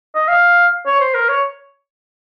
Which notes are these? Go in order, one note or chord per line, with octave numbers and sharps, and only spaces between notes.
D#5
F5
C#5
C5
A#4
C#5